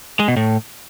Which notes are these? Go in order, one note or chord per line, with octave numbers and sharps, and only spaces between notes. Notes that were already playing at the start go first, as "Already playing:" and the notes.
G#3
B2
A2